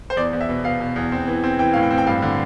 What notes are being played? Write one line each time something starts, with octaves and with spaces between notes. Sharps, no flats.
C5
E2 D5
E2
E5
B2
B2 F5
B2
E2
C4
E3
C4
E3 G5
A2 F5
G5
C4
G5
G2 F5
D3